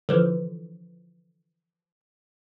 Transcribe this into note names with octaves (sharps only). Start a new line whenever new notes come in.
D3 E3 F3